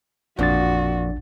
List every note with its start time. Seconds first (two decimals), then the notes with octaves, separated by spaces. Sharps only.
0.39 A1 F2 A#2 D4 F#4 A6